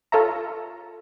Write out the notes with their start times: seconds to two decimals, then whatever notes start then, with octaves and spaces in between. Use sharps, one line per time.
0.12 F4 A4 C#5 E5 A#5